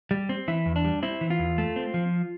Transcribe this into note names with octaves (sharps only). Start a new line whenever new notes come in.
G3
C4
E3 E4
E2
D4
G3
C4 E4
E3
F4
E2
A3
C4
F3